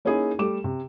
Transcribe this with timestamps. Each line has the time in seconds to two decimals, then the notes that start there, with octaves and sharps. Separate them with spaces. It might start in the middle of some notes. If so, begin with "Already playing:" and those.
0.05 A#3 C#4 D#4 E4 G#4
0.39 G3 A3 D6 E7
0.64 C3